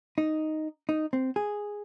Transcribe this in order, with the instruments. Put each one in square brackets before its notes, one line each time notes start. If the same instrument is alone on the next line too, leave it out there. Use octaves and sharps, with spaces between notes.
[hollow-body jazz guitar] D#4
D#4
C4
G#4